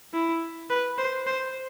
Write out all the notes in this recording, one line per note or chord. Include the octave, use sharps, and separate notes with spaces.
E4
B4
C5
C5